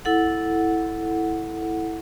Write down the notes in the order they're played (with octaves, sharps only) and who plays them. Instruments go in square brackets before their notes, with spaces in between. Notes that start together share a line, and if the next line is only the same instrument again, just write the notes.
[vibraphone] E4 A4 F#5